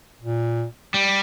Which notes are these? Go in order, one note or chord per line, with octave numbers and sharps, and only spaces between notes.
A#2
G3